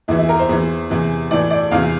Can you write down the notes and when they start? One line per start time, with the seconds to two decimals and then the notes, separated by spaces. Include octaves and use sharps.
0.08 E2 E3 E4
0.18 E4
0.29 A#4
0.39 C5
0.49 E2 E3
0.90 E2 C3 E3
1.31 A2 E3 D5
1.51 D5
1.71 E2 C3 E3 F5